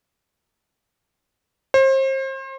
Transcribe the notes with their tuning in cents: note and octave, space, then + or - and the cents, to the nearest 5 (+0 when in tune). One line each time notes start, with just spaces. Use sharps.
C5 +35